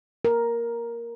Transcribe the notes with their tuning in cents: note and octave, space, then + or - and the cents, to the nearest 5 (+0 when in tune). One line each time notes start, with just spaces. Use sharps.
A#4 +5